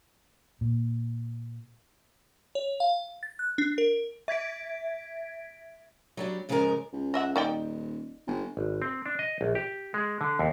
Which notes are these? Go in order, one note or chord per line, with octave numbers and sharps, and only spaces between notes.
A#2
C#5
F5
A6
F#6
D4
A#4
E5 G#6 B6 D7
F#3 G3 D4
G#2 C#3 F3 G#3 F#4 A#4
C#2
D#5 E5 F#5
D#1 D#4 D5 G5
G1
G#1
C4
D4
D#5
A#1
G4
G#3
D3
D#2